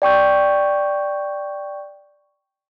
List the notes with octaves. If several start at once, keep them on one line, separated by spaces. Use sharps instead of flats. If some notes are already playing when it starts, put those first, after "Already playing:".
D5 G5 C#6 G6